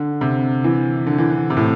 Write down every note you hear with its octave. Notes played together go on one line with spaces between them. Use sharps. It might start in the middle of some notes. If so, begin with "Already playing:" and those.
Already playing: D3
C3
E3
D3
E3
D3
C3
A2